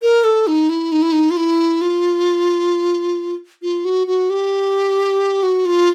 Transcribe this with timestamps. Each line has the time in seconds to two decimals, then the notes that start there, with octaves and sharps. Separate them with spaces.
0.02 A#4
0.24 A4
0.47 D#4
0.69 E4
0.92 D#4
1.02 E4
1.12 D#4
1.30 F4
1.37 E4
1.81 F4
3.62 F4
3.85 F#4
4.07 F#4
4.30 G4
5.43 F#4
5.65 F4